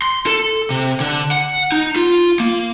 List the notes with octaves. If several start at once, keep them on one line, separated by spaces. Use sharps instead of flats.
C6
A4
C3
D3
F#5
D#4
F4
A#3